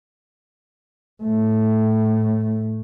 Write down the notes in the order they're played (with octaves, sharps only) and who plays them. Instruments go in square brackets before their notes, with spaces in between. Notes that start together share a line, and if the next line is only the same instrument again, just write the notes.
[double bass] A2 A3